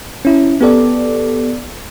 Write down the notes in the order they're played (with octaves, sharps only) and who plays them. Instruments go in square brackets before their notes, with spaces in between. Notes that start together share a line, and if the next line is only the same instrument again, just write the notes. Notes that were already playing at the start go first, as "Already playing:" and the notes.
[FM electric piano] C#4 E4
B3 G4 A4 D5